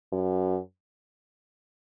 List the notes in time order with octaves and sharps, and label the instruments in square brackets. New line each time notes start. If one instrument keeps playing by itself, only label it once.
[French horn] F#2